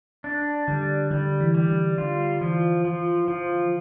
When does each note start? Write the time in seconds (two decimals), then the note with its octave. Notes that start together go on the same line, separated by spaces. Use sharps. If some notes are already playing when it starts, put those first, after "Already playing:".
0.24 D4
0.67 D3 G3
1.11 D3 G3
1.41 E3
1.55 G3
1.69 D3
1.98 D3 F4
2.41 E3 F3
2.85 F3
3.28 F3